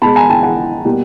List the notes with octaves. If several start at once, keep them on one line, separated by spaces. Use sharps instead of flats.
B2 G#3 A5 B5
G#5 A#5
G5 A5
F#5 G#5
B2 G3 A#3